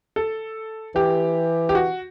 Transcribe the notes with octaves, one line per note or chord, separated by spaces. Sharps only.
A4
E3 G4
G4
F#4